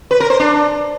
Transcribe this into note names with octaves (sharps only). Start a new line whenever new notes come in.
B4
A#4
C5
D4